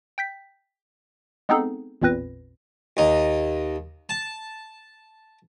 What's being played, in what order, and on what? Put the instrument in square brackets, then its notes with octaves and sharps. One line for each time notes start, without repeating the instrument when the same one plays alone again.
[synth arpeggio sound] G5 G6 B6
G#3 B3 C4 D#4 G#4 A4
A1 E2 A#2 C4 B4 A#6
[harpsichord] D#2 D#4
A5